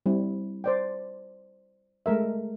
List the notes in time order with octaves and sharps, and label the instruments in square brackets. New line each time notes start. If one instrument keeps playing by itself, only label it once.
[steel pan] G3 C4 E4
C5 D5 G5
G#3 A3 A#4 E5